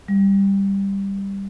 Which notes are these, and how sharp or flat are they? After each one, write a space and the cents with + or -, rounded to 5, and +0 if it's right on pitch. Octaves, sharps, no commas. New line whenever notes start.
G3 +10